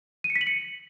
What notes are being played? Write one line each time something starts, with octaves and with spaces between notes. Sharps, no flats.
D#7
C#7
B6
F#7
C#7